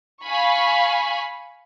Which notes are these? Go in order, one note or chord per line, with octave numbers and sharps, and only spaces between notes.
F5 G#5 B5 C#6